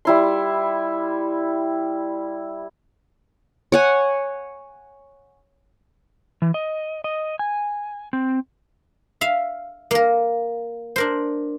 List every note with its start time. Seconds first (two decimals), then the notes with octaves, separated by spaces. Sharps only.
0.05 G3 E4 C6
3.72 C#5 F#5 G#5
6.42 E3
6.54 D#5
7.04 D#5
7.39 G#5
8.13 C4
9.21 E5 F5
9.91 A#3 A#4
10.96 D4 A#4 C5